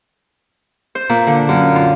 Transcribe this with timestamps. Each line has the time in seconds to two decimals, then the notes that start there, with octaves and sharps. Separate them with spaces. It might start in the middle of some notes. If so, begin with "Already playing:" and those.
0.95 C5
1.09 A#2
1.27 D3
1.49 F#2
1.76 F4